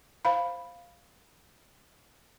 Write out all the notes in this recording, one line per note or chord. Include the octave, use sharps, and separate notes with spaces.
C5 F5 B5